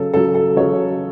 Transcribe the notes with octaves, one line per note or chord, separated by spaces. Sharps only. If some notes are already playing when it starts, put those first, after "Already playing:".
Already playing: C#3 F#3 A4
C#3 F#3 A4
A4
C#3 F#3 C#5